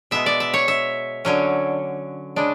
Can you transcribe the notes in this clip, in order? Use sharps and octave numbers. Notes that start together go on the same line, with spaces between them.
B2 G#3 B3 E5
D5
E5
C#5
E5
D3 F#3 C#4
C#3 G#3 D4